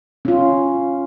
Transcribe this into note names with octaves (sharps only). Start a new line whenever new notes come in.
C#4 F4